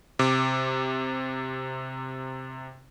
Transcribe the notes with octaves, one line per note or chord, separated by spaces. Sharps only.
C3 D6